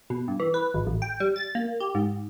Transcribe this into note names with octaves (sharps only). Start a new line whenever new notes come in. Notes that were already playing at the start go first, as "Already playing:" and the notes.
B2
G2
E3
B4
G#1
A1
G5
G3
A6
A#3
G4
G#2